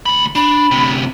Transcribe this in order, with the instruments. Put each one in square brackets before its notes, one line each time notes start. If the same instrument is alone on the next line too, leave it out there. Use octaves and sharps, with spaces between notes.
[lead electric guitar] D2 B5
[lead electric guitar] D4 [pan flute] B5
[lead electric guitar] D2 C3